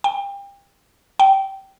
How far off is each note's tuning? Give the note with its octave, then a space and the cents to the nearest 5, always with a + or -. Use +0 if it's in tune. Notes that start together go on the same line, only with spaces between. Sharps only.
G5 +30
G5 -20